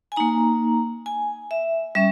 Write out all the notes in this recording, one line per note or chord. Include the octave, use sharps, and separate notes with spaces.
G#5
A#3 D#4 A#5
G#5
E5
G3 C#4 E5